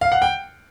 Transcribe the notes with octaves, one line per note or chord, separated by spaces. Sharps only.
F5
F#5
G5